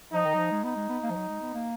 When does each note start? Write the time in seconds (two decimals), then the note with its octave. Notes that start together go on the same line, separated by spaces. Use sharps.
0.13 F3 D#4
0.25 D#3
0.34 F#3
0.38 F3
0.51 G#3
0.63 B3 D#4
0.76 G#3
0.89 B3
1.03 A#3
1.10 F3
1.16 F#3
1.29 G#3
1.41 B3
1.54 A#3